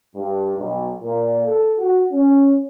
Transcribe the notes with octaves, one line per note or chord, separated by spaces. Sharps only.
G2
B1
A#2
A4
F#4
C#4